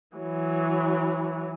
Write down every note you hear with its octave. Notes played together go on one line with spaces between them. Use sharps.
E3 F#3